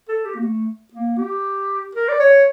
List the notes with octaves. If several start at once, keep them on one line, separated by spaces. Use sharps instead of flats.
A4
G4
A#3
A3
A#3
G4
A#4
D5
C#5